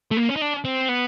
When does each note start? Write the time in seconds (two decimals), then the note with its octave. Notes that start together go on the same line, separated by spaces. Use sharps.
0.11 A3
0.17 A#3
0.29 C#4
0.36 D#4
0.41 D4
0.65 C4
0.89 B3